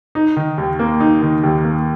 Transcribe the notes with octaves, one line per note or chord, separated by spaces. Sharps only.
D#4
D#3
D#2
A#3
D#4
D#3
D#2
A#3